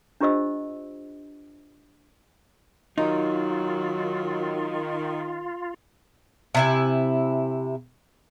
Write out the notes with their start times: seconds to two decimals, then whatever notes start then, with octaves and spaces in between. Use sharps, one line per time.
0.21 D4 F4 G4 C5 D#5 E6
2.98 D#3 F#3 D#4 F4
6.55 C3 E4 G#5